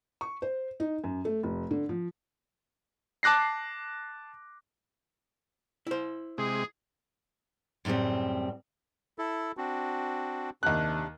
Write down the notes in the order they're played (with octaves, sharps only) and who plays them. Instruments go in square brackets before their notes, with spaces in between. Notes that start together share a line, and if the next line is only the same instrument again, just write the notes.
[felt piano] C#6
C5
D#4
F#2
A3
F1
D3
F3
[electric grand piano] A5 D6 F#6 A#6 C7
[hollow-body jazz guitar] E4 C5
[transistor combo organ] C3 G#3 [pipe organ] G#4
[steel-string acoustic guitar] F#2 A2 C#3 G3 C4
[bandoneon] E4 A4
C4 D4 F#4
[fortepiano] D#2 F#6 [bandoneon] C3 D4